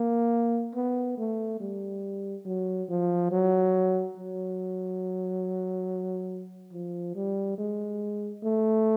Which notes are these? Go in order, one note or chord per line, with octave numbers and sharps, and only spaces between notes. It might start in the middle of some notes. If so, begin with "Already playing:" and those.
Already playing: A#3
B3
A3
G3
F#3
F3
F#3
F#3
F3
G3
G#3
A3